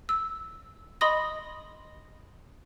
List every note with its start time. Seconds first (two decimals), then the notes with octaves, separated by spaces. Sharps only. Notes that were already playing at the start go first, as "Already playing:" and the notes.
0.09 E6
1.01 D#5 B5 C6 D#6 A#6